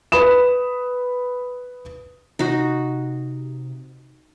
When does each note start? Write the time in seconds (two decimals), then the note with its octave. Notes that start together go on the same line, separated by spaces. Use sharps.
0.12 B4 B5 D#6 E7
2.39 C3 D#4 F#4